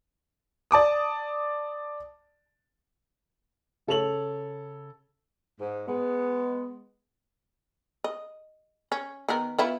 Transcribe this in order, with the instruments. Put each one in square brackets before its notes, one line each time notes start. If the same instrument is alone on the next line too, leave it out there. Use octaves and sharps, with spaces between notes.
[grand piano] D5 A5 D6 D#6
[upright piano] C#3 A4 C#5 F7 F#7
[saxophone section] G#2
G#3 B3
[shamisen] D#5
C#4
D#3 B3 A#4
B3 E4 F4